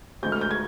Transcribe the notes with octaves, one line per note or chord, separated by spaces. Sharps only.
D2 D3 G#3 G6
F6
G6
G#6